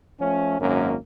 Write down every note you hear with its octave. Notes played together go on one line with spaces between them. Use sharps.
F3 A3 C#4
G#1 F#2 A#3 C#4